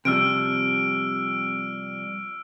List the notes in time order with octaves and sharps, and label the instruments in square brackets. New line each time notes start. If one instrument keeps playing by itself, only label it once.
[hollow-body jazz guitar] C3 F3 G3 [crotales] E6 F6 D7